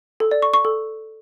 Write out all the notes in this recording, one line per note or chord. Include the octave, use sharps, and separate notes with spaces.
A4
D5
C#6
C#6
A4